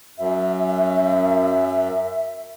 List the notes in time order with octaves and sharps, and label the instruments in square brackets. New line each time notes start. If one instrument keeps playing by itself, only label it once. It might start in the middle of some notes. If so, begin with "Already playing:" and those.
[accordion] F#2 [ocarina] E5